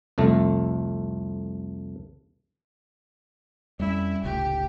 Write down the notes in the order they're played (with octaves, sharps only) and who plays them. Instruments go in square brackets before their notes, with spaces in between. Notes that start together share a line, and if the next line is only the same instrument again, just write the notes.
[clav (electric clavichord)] C2 F2 A3
[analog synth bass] F2 [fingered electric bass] G3 C#4 [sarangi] E4
[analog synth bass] F1 [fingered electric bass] C#2 A2 [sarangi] G4